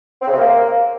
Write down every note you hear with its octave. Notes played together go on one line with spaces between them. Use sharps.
C4
C#3
C3
A#3